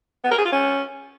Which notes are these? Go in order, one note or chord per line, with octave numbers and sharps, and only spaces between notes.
B3
A#4
G#4
F4
C#4